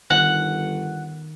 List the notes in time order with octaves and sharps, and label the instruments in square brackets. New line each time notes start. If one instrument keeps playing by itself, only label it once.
[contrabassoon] G1 [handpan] D#3 [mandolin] F#5